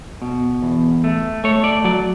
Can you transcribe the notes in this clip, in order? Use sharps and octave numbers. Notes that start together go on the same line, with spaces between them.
B2
E2
A3
A3 C#5
D5
F#3 D5